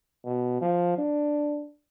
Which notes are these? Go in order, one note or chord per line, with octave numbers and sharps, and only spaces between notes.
B2
F3
D4